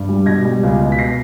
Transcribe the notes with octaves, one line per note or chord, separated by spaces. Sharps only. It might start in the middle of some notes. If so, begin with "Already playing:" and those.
Already playing: G2
G3
B2 G#6 A#6
G3
C#2
B2
B6
A#6 C7